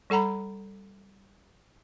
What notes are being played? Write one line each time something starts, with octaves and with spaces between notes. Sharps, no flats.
G3 A4 F#5 A#5 B5